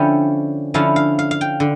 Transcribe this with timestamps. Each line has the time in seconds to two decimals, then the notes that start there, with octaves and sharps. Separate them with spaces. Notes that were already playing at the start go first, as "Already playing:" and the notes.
Already playing: D3 F3 C#4 E4 G5
0.74 D3 F3 C#4 E4 F5
0.96 F5
1.19 F5
1.31 F5
1.41 G5
1.60 D3